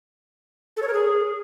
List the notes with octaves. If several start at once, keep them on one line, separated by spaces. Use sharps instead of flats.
A4
C#5
A#4
G#4